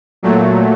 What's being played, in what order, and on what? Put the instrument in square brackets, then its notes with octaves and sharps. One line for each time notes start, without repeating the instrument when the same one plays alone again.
[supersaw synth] A#2 F#3 A3